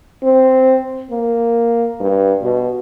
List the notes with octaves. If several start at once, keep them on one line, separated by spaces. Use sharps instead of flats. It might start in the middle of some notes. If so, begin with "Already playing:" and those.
C4
A#3
G2
B2